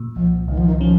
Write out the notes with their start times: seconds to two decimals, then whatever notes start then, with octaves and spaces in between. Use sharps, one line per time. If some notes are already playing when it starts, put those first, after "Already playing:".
Already playing: A#2
0.16 C2 F3
0.48 C2 D#3
0.58 F3
0.67 D#3
0.80 F3 C#4